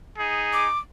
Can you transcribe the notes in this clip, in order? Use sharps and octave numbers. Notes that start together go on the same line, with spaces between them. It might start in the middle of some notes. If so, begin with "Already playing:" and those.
D#4 G#4
D6